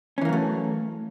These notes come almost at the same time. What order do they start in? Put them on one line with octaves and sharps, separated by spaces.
C#4 E3 A#3 F#3 A3